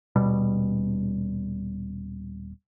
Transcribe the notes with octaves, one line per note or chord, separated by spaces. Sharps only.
D#1 B2 G3